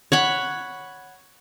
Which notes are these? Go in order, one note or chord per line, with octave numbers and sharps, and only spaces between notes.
C#5 F#5 B5